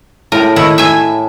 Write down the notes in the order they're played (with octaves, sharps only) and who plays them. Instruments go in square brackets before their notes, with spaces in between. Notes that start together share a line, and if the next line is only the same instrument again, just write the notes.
[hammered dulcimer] A2 G5 [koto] A#4
[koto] D#3 E4
E5 G#5